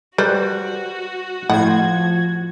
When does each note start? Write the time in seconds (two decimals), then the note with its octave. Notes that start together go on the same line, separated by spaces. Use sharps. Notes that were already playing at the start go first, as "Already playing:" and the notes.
0.18 G3 F#4 B4 C5
1.50 A2 F3 F#5 G#6